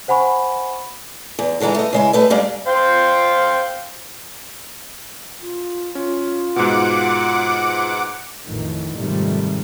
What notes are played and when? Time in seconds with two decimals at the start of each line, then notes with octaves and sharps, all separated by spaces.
0.08 C5 F#5 G#5 B5 C#6
1.39 E2
1.60 F2 D3 E3 G#3 A#5
1.75 A3 D#5
1.93 C#3 G#3 E4
2.13 A3 B4 D#5
2.30 G3 G#3 A#3 D4
2.67 C5 F5 G5
5.42 F4
5.95 C#4 F4
6.56 G#2 B2 F#5 D6
8.44 A1 F2 A2 D#3 E3
8.96 F2 G#2 C3 D#3 G3 A3